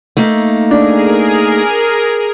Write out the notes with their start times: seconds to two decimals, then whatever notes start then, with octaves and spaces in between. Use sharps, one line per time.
0.17 A3 A#3 D#4
0.71 D4 G#4 A#4